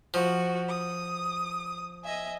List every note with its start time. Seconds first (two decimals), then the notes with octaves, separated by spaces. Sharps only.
0.14 F3 F#4
0.68 D#6
2.04 D#5 E5 G#5